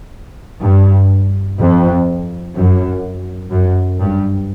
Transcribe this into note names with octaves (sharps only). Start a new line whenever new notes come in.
G2
F2
F#2
F#2
G2